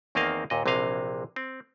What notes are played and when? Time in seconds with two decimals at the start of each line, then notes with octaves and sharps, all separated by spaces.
0.15 E2 D#3 A#3 C4 D#5 F5
0.50 D#2 A#2 D#5
0.66 A#1 C3 E3 D#5 F5
1.36 C4